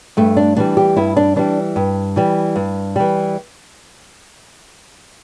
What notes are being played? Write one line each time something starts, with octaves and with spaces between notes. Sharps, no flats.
G2 A3
D4
E3 G3 D4
G4
G2 E4
D4
E3 G3 D4
G2
E3 G3
G2
E3 G3